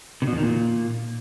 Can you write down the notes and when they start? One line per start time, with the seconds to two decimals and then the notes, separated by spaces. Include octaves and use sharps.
0.22 C3
0.27 B2
0.32 E2
0.38 D#3
0.43 A#2